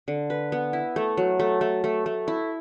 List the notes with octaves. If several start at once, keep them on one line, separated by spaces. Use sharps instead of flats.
D3
B4
B3
E4
A3
F#3
A3
A3
A3
A3
E4